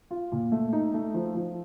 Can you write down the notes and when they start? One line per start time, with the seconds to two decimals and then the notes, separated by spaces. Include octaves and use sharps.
0.11 F4
0.32 A#2
0.52 A3
0.73 D#4
0.94 A3
1.14 F3
1.35 F3